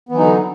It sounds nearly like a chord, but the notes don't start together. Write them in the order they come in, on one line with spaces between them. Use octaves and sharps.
B3 E3 F#3 D#4 D3